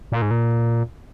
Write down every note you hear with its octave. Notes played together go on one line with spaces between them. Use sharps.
A#2
G#2
A#2